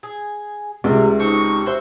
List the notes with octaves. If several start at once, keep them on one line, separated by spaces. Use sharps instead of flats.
G#4
C#2 C3 A3 A#4 D5
C4 D4 D#4 G4 C#6
F#4 C5 E5